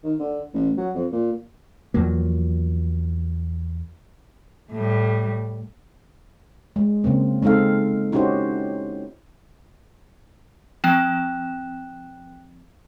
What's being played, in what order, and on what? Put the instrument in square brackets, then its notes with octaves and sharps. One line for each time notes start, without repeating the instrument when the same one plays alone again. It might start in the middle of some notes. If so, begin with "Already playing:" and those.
[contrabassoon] D#3
D3
A1
F#3
F2
A#2
[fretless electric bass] E2 F3 F#3 A#3
[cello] A2 G3
[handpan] G#3
C#3 A#3 C4
G#3 C4 D#4 A4 F5
C#4 D#4 E4 F#4 G4 C5
[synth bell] F3 C4 E7 [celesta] G5 F#6